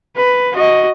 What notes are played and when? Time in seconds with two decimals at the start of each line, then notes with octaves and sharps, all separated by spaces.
0.16 B4
0.54 F#4 D#5